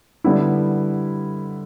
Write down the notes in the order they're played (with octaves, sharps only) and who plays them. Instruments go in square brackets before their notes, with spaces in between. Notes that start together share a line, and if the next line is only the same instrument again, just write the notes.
[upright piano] D3 G3 B3 E4